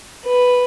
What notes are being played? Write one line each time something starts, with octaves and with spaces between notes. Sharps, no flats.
B4